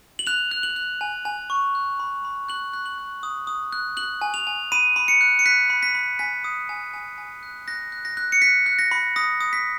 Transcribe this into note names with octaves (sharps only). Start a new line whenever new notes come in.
F#7
F#6 F7
F#6
F#7
F#6
G#5
G#5
C#6
F#6
B5
B5
F#6 F#7
F#6
F#7
F#6
D#6
D#6
F#6
F#6 F#7
G#5
F7
G#5
B5 D#7
B5
C#7
F#6
C#7
F#6 B6
B5
B6
B5
G#5 B6
D#6
G#5
G#5
G#5
F#6
F#6 A#6
F#6
A#6
F#6
C#7
F#6 B6
F#6
A#6
B5
D#6 A#6
D#6
B6